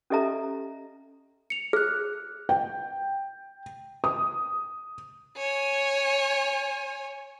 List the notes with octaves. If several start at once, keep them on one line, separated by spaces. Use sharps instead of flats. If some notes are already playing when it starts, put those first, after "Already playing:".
C#4 G4 A4 D#5 E5 A#5
C#7 F7
G#4 F6 F#6
G5
D#6
C#5 G#5